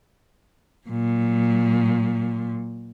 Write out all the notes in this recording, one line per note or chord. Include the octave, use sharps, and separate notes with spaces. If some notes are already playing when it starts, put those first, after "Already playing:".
A#2 F#3